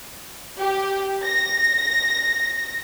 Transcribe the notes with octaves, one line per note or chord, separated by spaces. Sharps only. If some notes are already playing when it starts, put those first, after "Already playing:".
G4
A#6